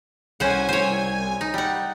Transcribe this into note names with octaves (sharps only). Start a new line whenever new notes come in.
C2 C#4 C5 F#5 G#5
C5 C#5
D#4
G3 F#5